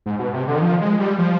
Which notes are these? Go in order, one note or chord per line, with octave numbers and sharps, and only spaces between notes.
G#2
B2
C3
D3
D#3
F3
G#3
G3
F3